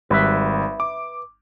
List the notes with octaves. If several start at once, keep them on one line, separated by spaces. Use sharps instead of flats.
G#1 G3 B4 E5
D6